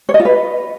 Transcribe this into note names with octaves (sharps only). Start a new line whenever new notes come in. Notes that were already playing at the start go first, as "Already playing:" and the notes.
C#5
D#5
F4
B4